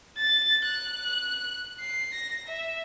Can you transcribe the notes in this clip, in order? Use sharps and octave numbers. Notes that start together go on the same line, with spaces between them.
A6
F#6
C7
A#6
E5